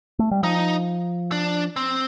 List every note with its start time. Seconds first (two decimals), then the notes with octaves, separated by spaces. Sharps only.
0.19 A3
0.31 G3
0.43 F3 D#4
1.32 D4
1.76 C4